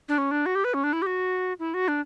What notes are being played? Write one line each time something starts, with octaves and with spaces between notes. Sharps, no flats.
D4
C#4
D4
F#4
G4
B4
C#4
D4
E4
G4
F#4
E4
F#4
D4